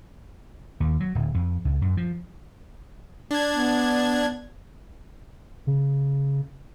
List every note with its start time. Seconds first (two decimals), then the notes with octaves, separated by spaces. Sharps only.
0.80 D#2
1.00 F#3
1.15 D1
1.34 F2
1.65 C#2
1.82 F#2
1.97 F3
3.31 D4 G#6
3.54 B3
5.67 C#3